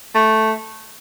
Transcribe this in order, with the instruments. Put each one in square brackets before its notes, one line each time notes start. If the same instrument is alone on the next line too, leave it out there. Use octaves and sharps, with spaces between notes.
[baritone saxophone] A3